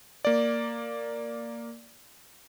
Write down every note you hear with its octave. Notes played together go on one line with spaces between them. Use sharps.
A#3 D5